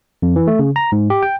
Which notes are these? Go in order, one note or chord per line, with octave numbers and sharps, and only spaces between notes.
F2
E3
A3
C#3
A#5
G#2
G4
G5